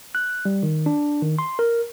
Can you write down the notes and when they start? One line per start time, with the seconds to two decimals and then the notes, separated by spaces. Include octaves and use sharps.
0.15 F#6
0.45 G3
0.63 D#3
0.86 D4
1.22 D#3
1.39 C6
1.59 A#4